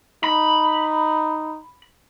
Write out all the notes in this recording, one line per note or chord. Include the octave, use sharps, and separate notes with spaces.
D#4 B5